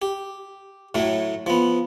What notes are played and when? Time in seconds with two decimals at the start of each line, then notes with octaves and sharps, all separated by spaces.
0.02 G4
0.95 A2 F#3 A3
1.46 F3 B3